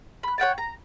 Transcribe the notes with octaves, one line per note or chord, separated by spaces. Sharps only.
B5 F#6
C#5 F#5 G5 A5
A#5